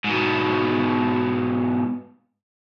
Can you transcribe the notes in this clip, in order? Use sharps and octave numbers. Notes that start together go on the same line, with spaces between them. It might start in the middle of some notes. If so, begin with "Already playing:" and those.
G#2 B2